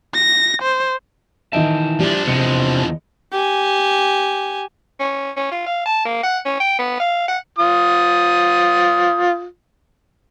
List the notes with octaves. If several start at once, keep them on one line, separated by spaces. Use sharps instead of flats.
A#6
C5
D#3 E3 D#5 E5 G5 A5
F3 G3 D4
E2 C3 D#5 C6 C#7
G4 G#5
C#4
C#4
F4
F5
A5
A#3
F#5
C#4
G5
B3
F5
F#5
F4 D#6